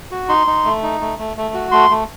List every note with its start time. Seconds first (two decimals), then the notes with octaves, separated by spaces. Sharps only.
0.11 F#4
0.29 D#4 C6
0.47 D#4
0.65 A3
0.83 D#4
1.01 A3
1.19 A3
1.37 A3
1.54 F#4
1.72 A3 C6
1.90 A3